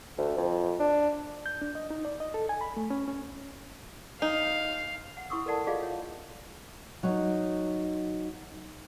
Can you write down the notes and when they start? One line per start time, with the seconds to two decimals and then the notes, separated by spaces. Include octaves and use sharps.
0.18 D2
0.37 F2
0.79 D4
1.46 G6
1.62 D4
1.75 D#5
1.90 D#4
2.05 D5
2.20 D#5
2.34 A4
2.49 G#5
2.61 B5
2.77 A3
2.90 C#4
3.08 C#4
4.22 D#4 F5
5.17 F#5
5.30 E4 C6 C#6 D#6 E6
5.46 A4 A#4 D5 F#5 A5
5.67 F4 G#4 D5 D#5 F5
5.82 C#5
7.03 F#3 D#4